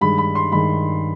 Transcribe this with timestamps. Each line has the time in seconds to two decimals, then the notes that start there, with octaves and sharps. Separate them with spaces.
0.01 G2 D#3 G#3 B5
0.18 B5
0.35 C6
0.52 G2 D#3 G#3 B5